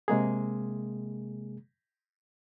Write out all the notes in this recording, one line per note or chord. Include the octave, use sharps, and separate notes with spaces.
C3 G#3 A#3 G#4